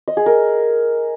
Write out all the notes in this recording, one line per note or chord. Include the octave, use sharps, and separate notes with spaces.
D#5
G#4
A#4